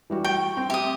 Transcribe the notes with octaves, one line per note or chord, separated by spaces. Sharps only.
E3 G3 F#4
G5 C#6
C4
G4 E5 D#6